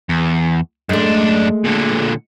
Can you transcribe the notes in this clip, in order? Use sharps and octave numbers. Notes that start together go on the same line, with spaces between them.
E2
F#2 G#3 A3 D4
A#2 D3